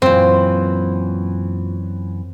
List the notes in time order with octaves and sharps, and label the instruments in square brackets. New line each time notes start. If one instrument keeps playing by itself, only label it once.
[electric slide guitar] F#2 E3 [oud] A#2 C5 [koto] C4